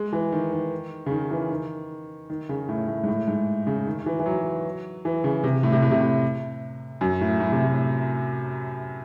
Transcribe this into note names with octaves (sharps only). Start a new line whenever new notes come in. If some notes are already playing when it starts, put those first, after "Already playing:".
Already playing: G#3
E3
D#3
D#3
C#3
D#3
E3
D#3
D#3
C#3
A2
A2
G#2
A2
G#2
C#3
D#3
D#3
E3
E3
F#3
E3
C#3
C3
A2
C3
A2
C3
A2
F#2
A2
A2
C3
A2